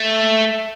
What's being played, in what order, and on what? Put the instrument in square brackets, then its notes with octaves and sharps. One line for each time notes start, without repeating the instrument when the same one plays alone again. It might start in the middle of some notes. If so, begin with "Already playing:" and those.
Already playing: [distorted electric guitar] A3